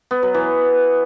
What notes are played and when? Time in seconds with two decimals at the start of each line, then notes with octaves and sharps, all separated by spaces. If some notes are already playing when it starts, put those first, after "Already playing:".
0.11 B3
0.23 F#3
0.34 E3